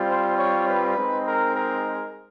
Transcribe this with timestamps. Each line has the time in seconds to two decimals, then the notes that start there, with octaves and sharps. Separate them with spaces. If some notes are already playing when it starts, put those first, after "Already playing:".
Already playing: G3 C4 F4
0.09 C5
0.38 C#5
0.68 B4
0.97 G#3 C4 D#4
1.27 A#4
1.56 A#4